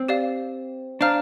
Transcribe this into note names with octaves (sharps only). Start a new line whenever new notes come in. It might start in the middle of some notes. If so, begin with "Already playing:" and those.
Already playing: C4
G4 D5 F5
D4 C5 F5 A#5 F6